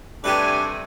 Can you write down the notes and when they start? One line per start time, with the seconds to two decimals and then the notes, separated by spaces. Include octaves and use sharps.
0.24 G2 C3 A3 D4 G4 B4 G#5